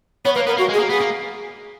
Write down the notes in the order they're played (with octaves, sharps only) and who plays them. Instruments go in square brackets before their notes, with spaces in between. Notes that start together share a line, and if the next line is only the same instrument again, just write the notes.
[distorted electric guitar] B3 [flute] C#5
[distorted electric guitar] A#3 [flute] B4
[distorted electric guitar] B3 [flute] A#4
[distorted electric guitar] A#3 [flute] F#4
[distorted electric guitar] G#3
[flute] G#4
[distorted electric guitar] A#3
[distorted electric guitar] B3 [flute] G#4
[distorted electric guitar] A#3